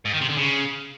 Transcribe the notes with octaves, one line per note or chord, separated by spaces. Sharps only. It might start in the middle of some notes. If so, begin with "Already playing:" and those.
G#2
D#3
C3
D3
C#3